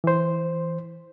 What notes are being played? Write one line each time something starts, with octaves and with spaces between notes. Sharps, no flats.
E3 C5